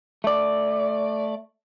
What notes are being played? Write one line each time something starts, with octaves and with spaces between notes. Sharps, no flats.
A3 D5